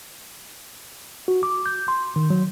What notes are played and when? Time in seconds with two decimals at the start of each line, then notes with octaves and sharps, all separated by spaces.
1.28 F#4
1.43 D6
1.66 G6
1.88 C6
2.16 D#3
2.30 F#3